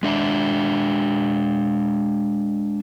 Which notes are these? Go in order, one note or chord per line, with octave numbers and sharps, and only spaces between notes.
G#3 D4 E5